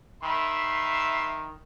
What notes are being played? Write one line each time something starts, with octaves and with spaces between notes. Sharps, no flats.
D#3 E5 B5 C6